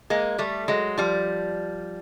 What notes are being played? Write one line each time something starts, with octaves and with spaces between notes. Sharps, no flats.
G#3 A#3
G3 A3
F#3 G#3
F3 G3